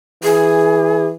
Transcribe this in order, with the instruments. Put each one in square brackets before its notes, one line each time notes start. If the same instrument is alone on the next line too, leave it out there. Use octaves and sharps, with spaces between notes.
[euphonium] E3 [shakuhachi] G#4